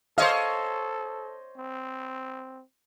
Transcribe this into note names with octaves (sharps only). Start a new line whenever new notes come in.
A4 C5 C#5 D#5 F5
C4